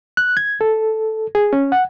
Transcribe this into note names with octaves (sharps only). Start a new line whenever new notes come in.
F#6
G#6
A4
G#4
C#4
F#5